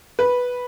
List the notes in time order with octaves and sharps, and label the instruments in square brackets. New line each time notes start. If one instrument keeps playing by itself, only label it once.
[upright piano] B4